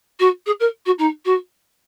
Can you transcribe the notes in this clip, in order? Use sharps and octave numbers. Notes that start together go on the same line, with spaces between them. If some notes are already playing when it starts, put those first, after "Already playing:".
F#4
G#4
A#4
F#4
D#4
F#4